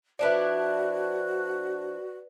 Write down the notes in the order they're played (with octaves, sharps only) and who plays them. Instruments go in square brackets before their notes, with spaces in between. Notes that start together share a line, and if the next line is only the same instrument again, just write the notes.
[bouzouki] F3 D4 E4 [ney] F#4 [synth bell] B4 D5